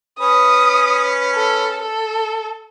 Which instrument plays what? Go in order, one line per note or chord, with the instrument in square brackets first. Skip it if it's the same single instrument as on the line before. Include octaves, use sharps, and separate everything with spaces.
[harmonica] C#4 B4 [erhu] D#6
[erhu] A4
A4